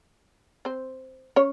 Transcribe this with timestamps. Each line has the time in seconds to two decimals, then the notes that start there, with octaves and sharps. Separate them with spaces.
0.65 C4 C5
1.36 C#4 C#5